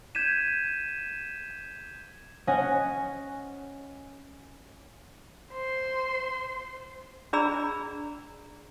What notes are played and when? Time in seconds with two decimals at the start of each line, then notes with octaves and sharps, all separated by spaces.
0.15 G6 G#6 B6 D#7 E7
2.47 C#4 C#5 D#5 F#5 G#5
5.51 C5 C6
7.33 D4 G#4 D5 A#5 B5 E6